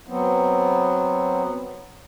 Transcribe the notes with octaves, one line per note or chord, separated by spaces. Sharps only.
F#3 B3 C4